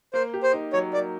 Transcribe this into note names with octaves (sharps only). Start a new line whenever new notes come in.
A#3 C5
G4
C5
D#4
F#3 C#5
A#3 D5